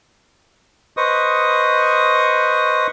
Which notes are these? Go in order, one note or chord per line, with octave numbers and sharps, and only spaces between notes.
B4 C5 D#5 C#6 D#6